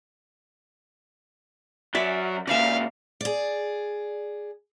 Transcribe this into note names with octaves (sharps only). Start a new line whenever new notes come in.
F#2 F#3 D5 E5
A#2 C#3 D5 E5 F5
G#4 D5